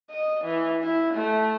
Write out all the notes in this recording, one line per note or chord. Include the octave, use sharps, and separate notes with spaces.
D#5
E3
E4
A3